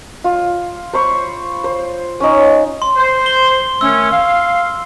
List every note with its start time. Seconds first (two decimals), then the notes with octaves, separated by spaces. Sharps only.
0.24 F4
0.93 C5 B5 C#6
1.64 C5
2.20 C#4 D#4
2.82 C6
2.97 C5
3.26 G7
3.81 D#3 A3 C#4 E6
4.11 F5